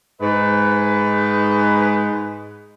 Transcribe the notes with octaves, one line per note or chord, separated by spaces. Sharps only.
G#2 B4 D#5